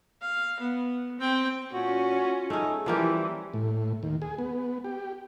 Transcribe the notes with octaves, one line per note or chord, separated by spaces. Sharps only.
F5
B3
C4 G5
A#2 C#4 F4 F#4
A3 C#4 D#4 G#4
E3 F3 G3 A#3 E4 G4
A2
D#2
G#4
B3
G4